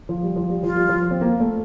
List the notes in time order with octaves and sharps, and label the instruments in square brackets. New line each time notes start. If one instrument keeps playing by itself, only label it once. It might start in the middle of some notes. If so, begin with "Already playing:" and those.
[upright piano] F3
G3
F3
G3
[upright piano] F3 [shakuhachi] F4
[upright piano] G3
F3
C4
A#3
A3